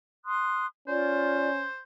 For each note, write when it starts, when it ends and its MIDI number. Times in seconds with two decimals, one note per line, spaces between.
0.25 0.65 84
0.25 0.65 87
0.25 0.65 90
0.88 1.66 61
0.88 1.48 65
0.88 1.82 72
0.88 1.48 74